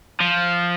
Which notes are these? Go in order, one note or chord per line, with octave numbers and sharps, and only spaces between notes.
F3